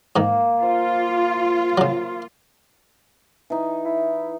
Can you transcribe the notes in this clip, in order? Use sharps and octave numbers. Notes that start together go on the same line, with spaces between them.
G#2 D#3 A#3
F4 C5
C#3 F#3
E3 D#4
E4